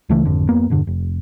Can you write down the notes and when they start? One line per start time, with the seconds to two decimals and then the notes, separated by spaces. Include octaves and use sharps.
0.09 C#2 C#3 E3 A3
0.25 G#1 F2 D3
0.49 F2 A#3 B3
0.70 E1 G2 D3
0.87 F1